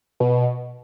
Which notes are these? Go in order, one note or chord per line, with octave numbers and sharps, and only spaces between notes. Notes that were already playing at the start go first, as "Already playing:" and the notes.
B2